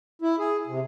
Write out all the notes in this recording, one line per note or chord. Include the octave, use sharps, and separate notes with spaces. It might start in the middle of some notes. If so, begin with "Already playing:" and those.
E4
G#4
C3